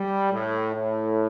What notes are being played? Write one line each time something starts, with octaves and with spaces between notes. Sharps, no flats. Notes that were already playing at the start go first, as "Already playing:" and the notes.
Already playing: G3
A2
A2